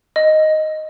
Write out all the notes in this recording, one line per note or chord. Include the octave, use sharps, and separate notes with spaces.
D#5